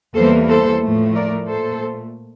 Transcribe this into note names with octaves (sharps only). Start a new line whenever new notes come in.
E2 E3 G3 A#3 A4 C5
A4 C5
A2 F3 A3
A#4 D5
A#2 A3 A4 C5